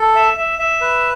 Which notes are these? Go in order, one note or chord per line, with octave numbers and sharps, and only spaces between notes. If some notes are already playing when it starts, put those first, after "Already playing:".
Already playing: A4
E5
E5
E5
B4